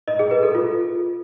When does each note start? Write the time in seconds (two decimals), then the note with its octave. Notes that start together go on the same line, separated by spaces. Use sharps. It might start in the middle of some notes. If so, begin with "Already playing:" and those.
0.08 D#5
0.19 G#4
0.31 B4
0.43 A4
0.55 F4